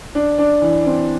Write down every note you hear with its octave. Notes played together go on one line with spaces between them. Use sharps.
D4
D4
E3
C4